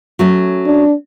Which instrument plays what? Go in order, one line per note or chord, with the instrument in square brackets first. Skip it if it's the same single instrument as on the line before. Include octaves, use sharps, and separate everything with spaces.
[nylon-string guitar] F#3 A3 C#4
[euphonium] D4